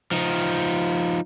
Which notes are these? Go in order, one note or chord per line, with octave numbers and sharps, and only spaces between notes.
F3 D#4